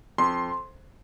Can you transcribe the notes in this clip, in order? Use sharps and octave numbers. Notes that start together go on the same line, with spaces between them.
F2 C6